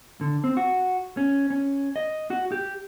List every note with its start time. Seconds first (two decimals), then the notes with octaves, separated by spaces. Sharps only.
0.21 D3
0.44 C4
0.57 F#4
1.17 C#4
1.50 C#4
1.96 D#5
2.30 F#4
2.52 G4